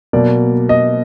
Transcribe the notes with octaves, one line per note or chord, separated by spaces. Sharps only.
B2 F#3 A#3 D5
D#5